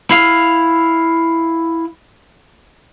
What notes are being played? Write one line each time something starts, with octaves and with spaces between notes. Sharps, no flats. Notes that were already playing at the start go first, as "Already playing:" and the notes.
E4 F5